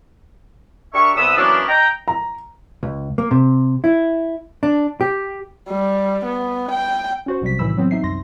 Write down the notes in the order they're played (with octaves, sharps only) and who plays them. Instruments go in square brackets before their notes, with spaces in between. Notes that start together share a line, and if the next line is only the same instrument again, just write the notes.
[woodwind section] D4 G4 A#4 E5 C#6
C2 B3 D#6 E6
E3 F#3 A#3 B3 C#4 D4
D#5 G5 A#5
[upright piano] A#5
[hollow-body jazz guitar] C#2
A#3
C3
E4
D4
G4
[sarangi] G3
B3
G5
[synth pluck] C#4 F#4 C5
B1 C3 G3 B6
A2 D#3 E3 B5 E6
F#3 B3 C4
D#4 E5 C7
C2 F#2 C6 A#6